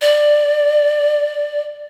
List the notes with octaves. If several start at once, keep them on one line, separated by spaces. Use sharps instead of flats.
D5